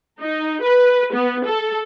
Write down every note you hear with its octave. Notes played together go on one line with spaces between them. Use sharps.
D#4
B4
B3
A4